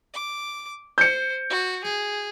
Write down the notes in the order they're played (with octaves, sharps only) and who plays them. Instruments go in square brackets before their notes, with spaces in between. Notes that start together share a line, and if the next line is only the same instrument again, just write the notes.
[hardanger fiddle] D6
[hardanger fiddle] C5 [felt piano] G6 C#7
[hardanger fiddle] F#4
G#4